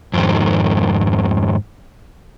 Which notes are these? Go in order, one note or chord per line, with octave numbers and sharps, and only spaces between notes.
F2 G#2 D#3